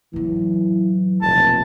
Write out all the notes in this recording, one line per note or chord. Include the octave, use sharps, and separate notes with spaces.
A2 E3 F#3
F1 A#1 B2 A5